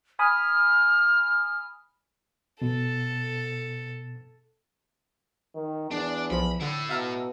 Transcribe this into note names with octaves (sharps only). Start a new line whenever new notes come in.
G#5 B5 D#6 F6
B2 A4
D#3
E2 D4
B1 F3 B5
D3 E4 A4
B2 E5 F5 A#5